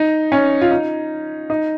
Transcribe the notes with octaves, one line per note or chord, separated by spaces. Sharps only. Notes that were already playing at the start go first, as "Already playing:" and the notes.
Already playing: D#4
C#4
F4
D#4
D#4